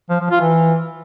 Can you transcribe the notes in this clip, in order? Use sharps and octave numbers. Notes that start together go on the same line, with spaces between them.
F3
F3
F4
E3